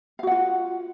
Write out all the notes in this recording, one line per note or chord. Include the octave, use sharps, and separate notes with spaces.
F4 F#4 F5 F#5